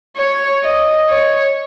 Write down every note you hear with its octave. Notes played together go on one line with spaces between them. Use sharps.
C#5
D#5
C#5